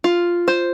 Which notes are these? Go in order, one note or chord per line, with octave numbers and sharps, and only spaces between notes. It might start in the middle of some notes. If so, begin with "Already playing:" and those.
F4
C5